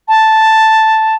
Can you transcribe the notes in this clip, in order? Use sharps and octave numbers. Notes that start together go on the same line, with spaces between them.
A5